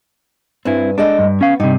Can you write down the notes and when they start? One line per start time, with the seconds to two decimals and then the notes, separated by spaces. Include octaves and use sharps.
0.65 G2 C4 E4 G#5
0.98 G#3 D4 A4 D#5
1.19 G2
1.41 B3 C#4 F5
1.60 G2 C3 D#4